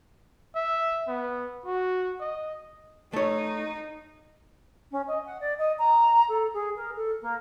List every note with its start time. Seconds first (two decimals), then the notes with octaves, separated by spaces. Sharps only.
0.55 E5
1.08 B3
1.65 F#4
2.20 D#5
3.13 A3 D#4 C#5
4.91 C#4
5.07 D#5
5.25 F#5
5.40 D5
5.58 D#5
5.78 A#5
6.28 A4
6.53 G#4
6.76 A#4
6.96 A4
7.21 A#3